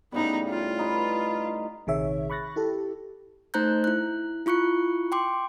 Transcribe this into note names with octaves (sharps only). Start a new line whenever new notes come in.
A2 C#3 G3 B3 D#4
F4
D#4 B4
A#1 C3 D#3 G#4 C#5 E5
B5 C#6 F#6 A6 A#6
E4 G4 A4
A3 D#4 C5 A#5 F#6 G6
E4 F#6
E4 F4 C#6 F#6 C#7
G5 C6 D6